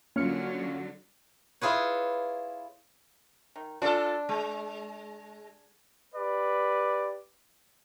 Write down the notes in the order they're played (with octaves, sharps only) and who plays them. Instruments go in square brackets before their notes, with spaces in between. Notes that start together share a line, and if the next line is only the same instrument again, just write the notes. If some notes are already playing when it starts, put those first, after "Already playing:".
[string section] D3 F#3 [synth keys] A#3 F6 C#7 [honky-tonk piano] C#4 F4
[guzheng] E4 F4 G#4 B4 C#5
[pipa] D#3
[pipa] D4 [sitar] F4 A4
[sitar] G#3
[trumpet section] G4 B4 D5